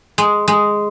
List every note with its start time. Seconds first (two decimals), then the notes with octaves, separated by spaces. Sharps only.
0.18 G#3
0.48 G#3